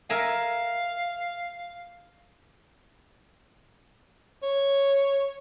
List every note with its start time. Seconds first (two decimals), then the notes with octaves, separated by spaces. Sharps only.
0.10 A#4 E5 F5 G#5
4.43 C#5